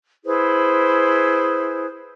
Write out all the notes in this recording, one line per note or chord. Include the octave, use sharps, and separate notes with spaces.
E4 G#4 B4 C5